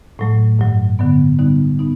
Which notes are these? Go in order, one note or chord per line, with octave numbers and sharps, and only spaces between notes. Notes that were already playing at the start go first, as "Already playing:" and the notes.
A2 F#3 A3
G2 D#3 F#3
D3 F#3 B3
D3 G3 B3 D#4
B3 D#4